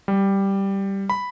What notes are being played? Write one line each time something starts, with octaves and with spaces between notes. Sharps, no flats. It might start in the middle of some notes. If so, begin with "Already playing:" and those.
G3
B5